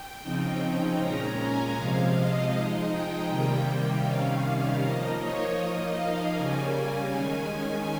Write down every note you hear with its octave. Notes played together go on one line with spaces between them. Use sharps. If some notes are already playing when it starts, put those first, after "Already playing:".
Already playing: G5
C#3 F3 C4 D#4 G5
A#2 G#3 C#4 A#5
G#5
C3 F3 G#3 F5
D#5
F3 G#3 D#4
G5
C3 D#3 G3 A#3 G5
C3 D#3 G3 C#4 F5
F5
F3 A#3 D#4 D#5
C#5
F3 A#3 D#4 D#5
F5
C#3 G3 A#3 C#4 G#5
D#3 G#3 C#4 G#5